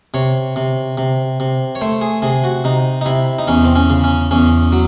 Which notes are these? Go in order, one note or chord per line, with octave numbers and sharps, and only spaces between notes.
C3 C#5
C3
C3
C3
C#5
A3 C5
G#4
C3 G#4
F#4
C3 D#4
D#4
C3 E4
D#4
E2 C#4
C4
C#4
C#3
C#4
E2 C#4
F#3